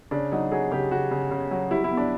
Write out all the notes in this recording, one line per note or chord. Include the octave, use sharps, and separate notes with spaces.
C#3 D4
F#3 D#4
F#3 G#4
C#3 G4
C#3 F#4
C#3
C#3
F#3
G3 E4
E4
B2
D4